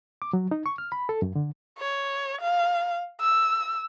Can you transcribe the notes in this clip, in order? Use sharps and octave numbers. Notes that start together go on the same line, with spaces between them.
D6
F#3
D#4
C#6
F6
B5
A4
F#2
D3
C#5
F5
E6